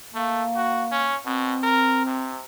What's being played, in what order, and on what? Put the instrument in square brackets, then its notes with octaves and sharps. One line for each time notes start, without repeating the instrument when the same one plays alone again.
[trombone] A3 [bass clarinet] A#3
[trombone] F#4
C#4
[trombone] B2 [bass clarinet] C4
[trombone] A#4
C3